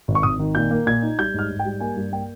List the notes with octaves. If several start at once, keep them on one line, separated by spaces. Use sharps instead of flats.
G#1
C#6
G#1 D#6
D#3
A#2 G6
A#3
A#2 G#6
D#4
G3 G6
G#2 F6
G#2
G5
G3
A#3 G#5
G2
A#3 G5